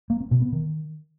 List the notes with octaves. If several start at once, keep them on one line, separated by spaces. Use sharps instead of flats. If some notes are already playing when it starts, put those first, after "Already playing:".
A#3
C4
B2
B3
D#3